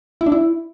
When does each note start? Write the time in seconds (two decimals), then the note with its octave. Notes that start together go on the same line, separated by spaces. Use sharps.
0.21 E4
0.26 D4
0.32 E4